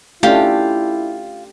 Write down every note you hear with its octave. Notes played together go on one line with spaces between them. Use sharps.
A3 C#4 D4 E4 F4 G4